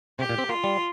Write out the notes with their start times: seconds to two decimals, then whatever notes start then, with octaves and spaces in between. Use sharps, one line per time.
0.19 C3 G4
0.29 A#2
0.38 C4
0.49 A#3 F4
0.64 G3